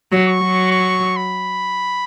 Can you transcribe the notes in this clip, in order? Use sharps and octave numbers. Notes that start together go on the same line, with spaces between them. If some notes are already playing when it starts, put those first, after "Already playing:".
F#3
C#6
F#3
C#6
B5